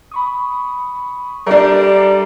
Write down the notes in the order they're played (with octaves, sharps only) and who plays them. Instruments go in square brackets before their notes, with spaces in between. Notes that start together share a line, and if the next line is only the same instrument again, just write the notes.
[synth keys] B5 C#6 D#6
[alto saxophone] G3 [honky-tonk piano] D4 A#4 [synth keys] G4 A4 E5